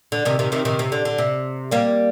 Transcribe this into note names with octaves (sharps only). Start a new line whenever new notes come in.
D3
C3 D#3
C3 D#3
C3 D#3
C3 D#3
C3
D3
D3
C3
G3 A#3